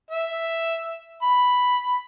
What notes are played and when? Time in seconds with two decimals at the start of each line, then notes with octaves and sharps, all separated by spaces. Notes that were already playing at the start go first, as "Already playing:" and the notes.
0.11 E5
1.22 B5